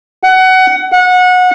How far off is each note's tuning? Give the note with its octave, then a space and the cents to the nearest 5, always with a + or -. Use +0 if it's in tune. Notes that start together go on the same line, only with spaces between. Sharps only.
F#5 +20
F#5 -25